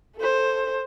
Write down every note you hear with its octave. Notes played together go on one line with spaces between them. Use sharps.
A4 C5